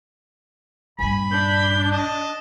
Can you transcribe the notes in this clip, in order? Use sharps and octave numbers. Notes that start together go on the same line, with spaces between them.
A#1 G2 G#5 B5
D4 G6
D#5 A5